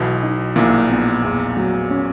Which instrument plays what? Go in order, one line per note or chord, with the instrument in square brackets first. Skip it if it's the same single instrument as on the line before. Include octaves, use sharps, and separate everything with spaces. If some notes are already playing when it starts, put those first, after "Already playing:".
Already playing: [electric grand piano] B1 B2 [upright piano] E3
[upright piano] D#4
[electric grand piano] A#1 A#2 [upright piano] E3
[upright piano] B3
E2
F#3
C#4